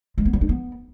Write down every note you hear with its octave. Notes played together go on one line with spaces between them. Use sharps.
G#3
B3
G3
D#4
B3